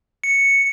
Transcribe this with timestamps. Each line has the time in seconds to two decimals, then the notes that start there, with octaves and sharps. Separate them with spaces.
0.24 C#7